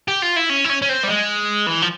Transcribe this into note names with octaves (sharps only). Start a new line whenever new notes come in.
G4
F4
E4
C#4
E4
C#4
C#4
C4
G3
G#3
E3
F3